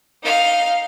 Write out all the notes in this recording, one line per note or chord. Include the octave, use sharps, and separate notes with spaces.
D#4 F5